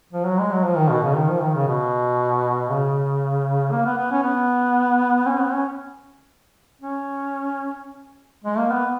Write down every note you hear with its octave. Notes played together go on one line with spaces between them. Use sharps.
F3
F#3
G#3
F#3
F3
D#3
B2
C#3
D#3
F3
D#3
C#3
B2
C#3
A#3
B3
B3
C#4
B3
C#4
B3
C#4
C#4
G#3
A#3
B3